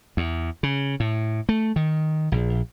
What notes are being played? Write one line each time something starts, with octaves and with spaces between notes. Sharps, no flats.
E2
C#3
A2
A3
D#3
A#1